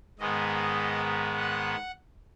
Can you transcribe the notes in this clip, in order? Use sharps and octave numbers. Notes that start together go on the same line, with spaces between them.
G#2 D#3 G#3 B3 D#5
F#5